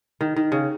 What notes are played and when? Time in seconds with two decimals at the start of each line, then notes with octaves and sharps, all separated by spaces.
0.21 D#3
0.36 D#3
0.52 C#3